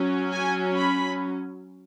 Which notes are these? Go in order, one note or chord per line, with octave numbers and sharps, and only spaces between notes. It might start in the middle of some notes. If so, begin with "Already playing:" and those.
Already playing: F#3 C#4
G#5
B5